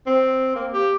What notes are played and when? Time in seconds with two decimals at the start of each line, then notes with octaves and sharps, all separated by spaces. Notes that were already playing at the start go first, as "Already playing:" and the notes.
0.07 C4
0.55 A#3
0.73 G4